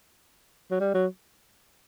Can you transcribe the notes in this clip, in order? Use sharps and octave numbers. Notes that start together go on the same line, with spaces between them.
F#3
G3
F#3